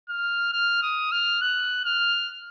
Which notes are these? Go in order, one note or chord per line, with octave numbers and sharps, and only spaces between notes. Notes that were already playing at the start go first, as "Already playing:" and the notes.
F6
F6
D#6
F6
F#6
F6